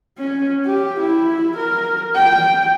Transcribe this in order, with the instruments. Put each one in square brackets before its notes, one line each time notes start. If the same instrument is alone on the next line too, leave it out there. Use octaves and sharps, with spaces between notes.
[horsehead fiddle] C#4
G4
E4
A#4
G5